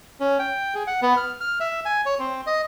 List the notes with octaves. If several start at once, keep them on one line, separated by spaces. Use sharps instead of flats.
C#4
G5
G#4
F#5
B3
F6
F6
E5
G#5
C#5
C4
D#5